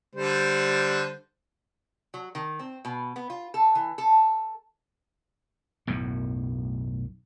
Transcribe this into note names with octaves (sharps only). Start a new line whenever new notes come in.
D3 G3 C5
F#3
D#3
C4
B2
B3
F4
A4
E3
A4
B1 F#2 A2